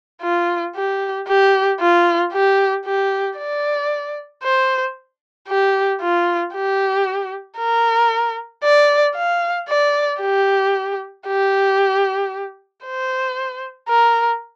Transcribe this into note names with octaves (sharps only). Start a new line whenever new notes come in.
F4
G4
G4
F4
G4
G4
D5
C5
G4
F4
G4
A#4
D5
F5
D5
G4
G4
C5
A#4